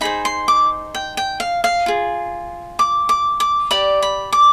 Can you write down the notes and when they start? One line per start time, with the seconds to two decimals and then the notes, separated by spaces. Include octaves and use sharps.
0.01 D#4 G#4 C5 B5
0.25 C6
0.48 D6
0.95 G5
1.17 G5
1.40 F5
1.64 F5
1.86 F4 G#4
2.79 D6
3.09 D6
3.40 D6
3.71 G4 D5 B5
4.02 B5
4.33 D6